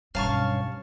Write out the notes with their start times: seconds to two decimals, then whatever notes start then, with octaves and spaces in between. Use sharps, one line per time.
0.15 B1 G2 C4 C#4 F5 A5 C#6